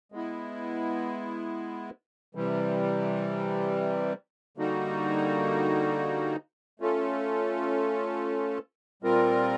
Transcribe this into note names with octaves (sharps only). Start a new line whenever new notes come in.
G#3 B3 E4
C3 E3 G3
D3 G3 A#3 D#4 F#4
A3 C#4 F4 A4
A#2 G3 C4 F4 A#4